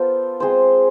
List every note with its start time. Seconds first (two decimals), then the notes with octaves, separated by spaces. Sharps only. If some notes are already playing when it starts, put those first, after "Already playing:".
Already playing: B3 F4 A4 C5
0.40 G#3 C4 G#4 C5